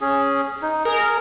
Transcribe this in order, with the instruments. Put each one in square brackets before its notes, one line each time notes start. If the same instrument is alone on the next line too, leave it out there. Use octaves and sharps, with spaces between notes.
[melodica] C#4 G#4
D#4
[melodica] G#4 [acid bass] A#4